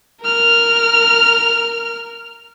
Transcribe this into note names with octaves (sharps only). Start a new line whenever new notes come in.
A#4 F6